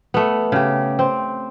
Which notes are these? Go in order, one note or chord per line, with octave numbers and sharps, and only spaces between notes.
A3 B3
C#3 G4
C4